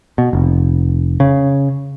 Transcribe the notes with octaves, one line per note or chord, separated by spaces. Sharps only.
B2
F1
C#3